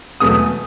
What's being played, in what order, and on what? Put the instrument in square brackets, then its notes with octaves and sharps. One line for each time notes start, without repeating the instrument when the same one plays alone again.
[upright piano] E1 E2 B2 F#3 A3 D#6